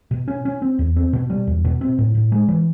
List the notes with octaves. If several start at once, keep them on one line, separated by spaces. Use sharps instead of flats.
B2
C#4
C#4
C4
E2
C4
B2
G3
E2
B2
C4
A2
A2
G#3
E3